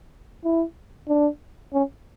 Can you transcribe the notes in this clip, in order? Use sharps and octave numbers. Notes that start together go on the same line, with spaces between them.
E4
D4
C#4